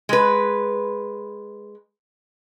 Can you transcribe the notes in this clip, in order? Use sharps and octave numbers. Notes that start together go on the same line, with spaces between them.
G#3 B4